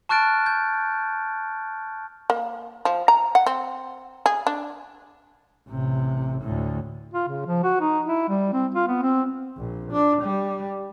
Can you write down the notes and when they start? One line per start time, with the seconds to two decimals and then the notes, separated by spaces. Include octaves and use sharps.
0.09 A5 C#6 F6 F#6 A6 D7
0.46 G6
2.30 A#3
2.85 F3
3.08 A#5
3.35 F#5
3.46 C4
4.26 G#4
4.47 D4
5.69 A1 C3
6.42 D2 A2
7.14 F4
7.28 C#3
7.46 F3
7.64 F#4
7.81 D#4
8.05 E4
8.29 G3
8.53 C4
8.75 F4
8.88 B3
9.02 C4
9.57 A#1
9.91 D4
10.22 G3